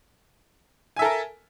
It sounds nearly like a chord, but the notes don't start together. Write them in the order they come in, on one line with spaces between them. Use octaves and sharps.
G#5 E5 A4 A#4